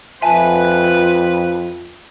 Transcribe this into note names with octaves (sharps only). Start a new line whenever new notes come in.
F2 F4 B4 E5 G#5 A5